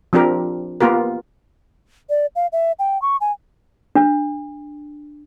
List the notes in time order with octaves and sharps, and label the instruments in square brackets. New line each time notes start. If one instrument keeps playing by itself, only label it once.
[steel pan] F3 C4 D4 G4 A#4
A#3 B3 F4 G4 A#4
[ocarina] D5
F5
E5
G5
C#6
G#5
[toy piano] D4